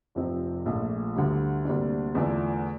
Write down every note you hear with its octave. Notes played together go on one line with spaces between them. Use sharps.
F1 F2 C3 F3 C4
A#1 A#2 A3
D2 D3 G3
D2 C3 G3 A#3 D4
E2 D3 A3 D4 F4